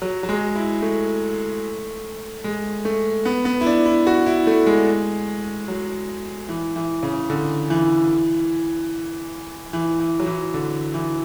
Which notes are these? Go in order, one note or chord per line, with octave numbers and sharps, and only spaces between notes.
F#3
F#3
G#3
E4
A3
G#3
A3
B3
B3
E4
D4
E4
F#4
E4
A3
G#3
F#3
E3
E3
C#3
D3
E3
E3
E3
F#3
E3
D3
E3